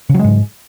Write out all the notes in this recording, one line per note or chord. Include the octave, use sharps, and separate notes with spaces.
G#2 C#3 F#3 G#3